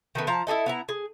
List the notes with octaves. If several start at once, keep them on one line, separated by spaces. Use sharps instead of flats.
D#3 A3 B3
F3 A5 A#5
E4 G#4 A4 D#5
B3 E4 A#5
G#4